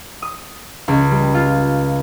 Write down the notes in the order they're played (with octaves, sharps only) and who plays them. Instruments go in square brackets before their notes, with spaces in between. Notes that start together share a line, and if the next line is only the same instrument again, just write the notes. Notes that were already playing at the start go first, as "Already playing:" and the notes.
[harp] D#6
C#2
G3
F4